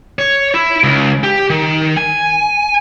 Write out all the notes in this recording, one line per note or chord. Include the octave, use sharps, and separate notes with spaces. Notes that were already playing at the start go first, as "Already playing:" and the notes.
C#5
E4
C#2
G4
D#3
G#5